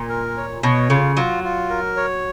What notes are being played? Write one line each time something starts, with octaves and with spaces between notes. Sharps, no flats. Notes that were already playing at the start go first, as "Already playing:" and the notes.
Already playing: A#2
A#4
C#5
B2 C#5
C#3 F4
F#3 F4
F4
A#4
C#5